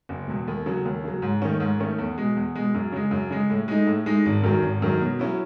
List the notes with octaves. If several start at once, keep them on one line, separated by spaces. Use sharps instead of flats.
F#1
E2 B2
D#2
C#3 F#3
D#2
C#3 F#3
G#2
D#3 A3 C#4
G#2
D#3 A3 C#4
E2
B2 G#3
E2
B2 G#3
F#2
C#3 G#3
F#2
C#3 G#3
A2
G#3 D#4
A2
G#3 D#4
G#1
F#2 D#3 F#3
G#1
F#2 D#3 F#3
B2
F#3 C#4 E4